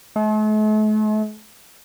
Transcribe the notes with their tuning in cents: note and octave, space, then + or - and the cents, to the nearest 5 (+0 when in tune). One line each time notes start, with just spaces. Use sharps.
A3 -45